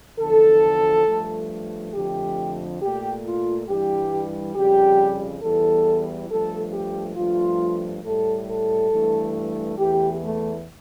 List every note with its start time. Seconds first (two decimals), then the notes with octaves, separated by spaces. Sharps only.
0.19 E2 D3 F3 A4
1.06 G2 F3 A3
1.93 F2 D3 F3 A3 G4
2.80 A#2 A3 G4
3.24 F4
3.67 G2 E3 G3 G4
4.55 F2 C#3 G3 G4
5.41 E2 E3 G3 A4
6.29 G2 F3 A3 A4
6.73 G4
7.16 G2 F3 A3 F4
8.04 A2 G3 A4
8.47 A4
8.91 G2 E3 A3
9.78 E2 E3 A3 G4
10.21 A3